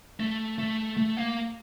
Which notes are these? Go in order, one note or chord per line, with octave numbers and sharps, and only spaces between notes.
A3
A3
A3
A#3